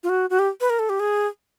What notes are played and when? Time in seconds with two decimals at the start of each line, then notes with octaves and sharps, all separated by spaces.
0.03 F4
0.09 F#4
0.30 F#4
0.39 G4
0.61 B4
0.70 A#4
0.79 A4
0.89 G4
1.00 G#4